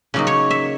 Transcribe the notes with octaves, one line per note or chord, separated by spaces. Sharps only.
C#3 F#3 A#3 D#4
C#5
E5